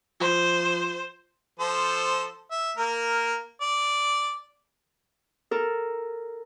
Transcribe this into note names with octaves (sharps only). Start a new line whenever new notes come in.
F3 C5
F3 A4 C5
E5
A#3 A#4
D5
A4 A#4